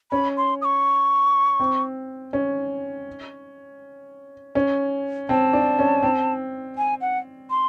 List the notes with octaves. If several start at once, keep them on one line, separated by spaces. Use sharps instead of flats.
C#4 B5
C6
D#6
C#6
C4
C#4
C#4
C4 A5
D4
C#4
C4
G#5
F#5
C6